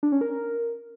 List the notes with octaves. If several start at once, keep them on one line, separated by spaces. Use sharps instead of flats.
D4
C#4
A#4